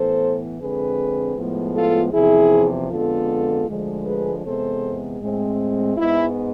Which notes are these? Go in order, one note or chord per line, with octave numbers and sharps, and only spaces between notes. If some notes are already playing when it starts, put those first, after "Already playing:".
Already playing: A2 E3 B3 A4 C5
F2 D3 G#3 C4 G#4 B4
A2 F3 G#3 B3
F4 A4
E2 C3 F3 E4 G#4
F2 D3 G#3 B3 F4 A4
D2 D3 F3 G#3
G#4 B4
E2 C3 G#3 B3 A4 C5
A2 G#3 C4
G#2 G#3 B3 E4